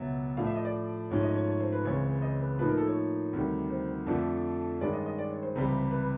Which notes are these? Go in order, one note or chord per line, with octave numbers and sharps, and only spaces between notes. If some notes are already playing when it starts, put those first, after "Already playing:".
Already playing: C#2 B2 F#3 E5
A2 F3 A3 D4 F5
E5
D#5
D5
G#2 F3 A3 C#4 C#5
D#5
C#5
C#5
C5
B4
C#2 C#3 E3 G#3 C4 C#5
C#5
D#5
B4
A2 F3 A#3 D#4 B4
A#4
A4
C#5
D2 C3 D#3 G3
C5
F2 D3 F3 A3 D4 A4
G2 D#3 G#3 C#4 D5
D#5
D#5
D5
C#5
C5
C#2 C3 E3 G3
B4